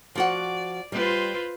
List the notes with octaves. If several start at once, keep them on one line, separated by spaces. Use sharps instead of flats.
F3 F#4 D5 F#5
G3 F4 B4 C5